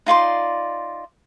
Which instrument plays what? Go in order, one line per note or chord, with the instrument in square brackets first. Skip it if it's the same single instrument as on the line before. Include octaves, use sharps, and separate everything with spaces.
[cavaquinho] D#4 F4 D5 C6